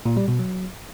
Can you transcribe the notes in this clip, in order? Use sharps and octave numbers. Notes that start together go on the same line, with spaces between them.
A#2
G3
B2
F#3